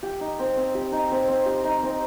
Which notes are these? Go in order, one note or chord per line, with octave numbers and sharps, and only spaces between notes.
G4
D#4
C4
C4
G4
D#4
C4
C4
G4
D#4
C4